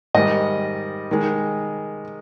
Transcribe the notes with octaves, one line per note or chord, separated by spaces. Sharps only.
G#2 D#3 G3 D#5
D#3 G#3